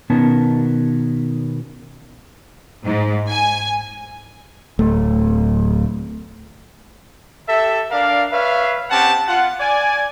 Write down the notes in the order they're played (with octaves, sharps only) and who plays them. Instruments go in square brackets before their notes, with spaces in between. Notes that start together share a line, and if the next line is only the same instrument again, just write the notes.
[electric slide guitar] B2 D#3 B3 C#4 A#4 A5
[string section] G#2
G#5
[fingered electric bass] D1 A3
[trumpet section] G4 A4 E5
D4 A#4 D5 F5
B4 C#5 E5 F5
C4 C#4 G4 F#5 A5
F4 F#5
D5 G#5